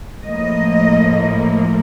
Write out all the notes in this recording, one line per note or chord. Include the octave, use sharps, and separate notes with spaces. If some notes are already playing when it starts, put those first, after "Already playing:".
A2 F3 A#3 D#5